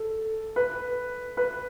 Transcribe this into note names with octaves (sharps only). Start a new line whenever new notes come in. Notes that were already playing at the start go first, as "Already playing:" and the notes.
Already playing: A4
B4
B4